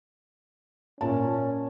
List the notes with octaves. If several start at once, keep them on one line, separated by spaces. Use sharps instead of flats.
A#2 C#4 A5